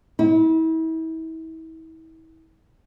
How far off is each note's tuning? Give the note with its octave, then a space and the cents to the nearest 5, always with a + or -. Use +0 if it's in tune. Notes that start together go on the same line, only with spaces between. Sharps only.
E4 -35